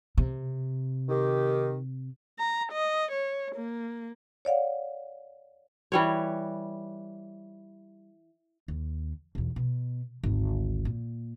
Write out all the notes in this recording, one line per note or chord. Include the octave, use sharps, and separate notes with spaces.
C3
D#3 G4
A#5
D#5
C#5
A#3
C#5 D5 F5 F#5
E3 G3 C#5
D#2
B1 E2
B2
G#1 D2
A#2